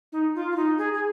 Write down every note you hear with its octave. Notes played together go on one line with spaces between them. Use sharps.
D#4
F4
F4
D#4
G#4
G#4